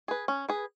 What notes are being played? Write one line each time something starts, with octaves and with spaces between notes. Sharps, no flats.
G#4 B4
C#4
G#4 B4